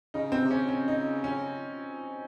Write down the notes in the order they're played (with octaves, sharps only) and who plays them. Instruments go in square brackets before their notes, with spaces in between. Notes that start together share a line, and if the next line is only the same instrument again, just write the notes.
[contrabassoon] C#3 [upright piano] D#4
[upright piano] C4
[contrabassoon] C3
[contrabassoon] C#3 [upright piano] C#4
[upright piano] C#4
D#4
C#4